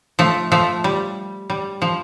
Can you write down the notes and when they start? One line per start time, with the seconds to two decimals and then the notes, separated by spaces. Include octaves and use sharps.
0.19 F3 A3
0.52 F3 A3
0.84 G3
1.50 G3
1.82 F3